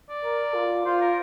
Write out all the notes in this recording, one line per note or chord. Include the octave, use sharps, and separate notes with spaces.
D5
A#4
F4
F4 C5
A#4